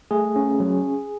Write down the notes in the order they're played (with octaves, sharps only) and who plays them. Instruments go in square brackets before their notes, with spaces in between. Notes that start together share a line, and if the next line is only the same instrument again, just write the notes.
[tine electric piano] A3 G#4
C#4
F#3